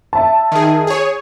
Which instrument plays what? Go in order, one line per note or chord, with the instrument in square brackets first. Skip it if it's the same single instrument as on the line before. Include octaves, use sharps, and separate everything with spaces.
[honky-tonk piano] E5 A5
[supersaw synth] D#3 G#4
G#4 C#5